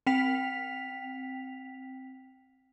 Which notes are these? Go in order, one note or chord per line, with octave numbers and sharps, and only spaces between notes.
C4 G5 B6 F7